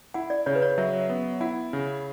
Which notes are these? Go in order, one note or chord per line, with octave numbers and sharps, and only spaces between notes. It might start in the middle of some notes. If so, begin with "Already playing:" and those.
E4 F#5
D5
C#3 C#5
B4
C#5
F#3 E5
B3
E4 F#5
C#3